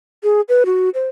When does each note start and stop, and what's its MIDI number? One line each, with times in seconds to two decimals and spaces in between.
0.23 0.41 68
0.49 0.64 71
0.66 0.89 66
0.94 1.07 72